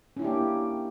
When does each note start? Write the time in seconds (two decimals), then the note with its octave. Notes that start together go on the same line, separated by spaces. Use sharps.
0.17 C#4
0.19 E4
0.22 D4
0.25 G4
0.27 A#3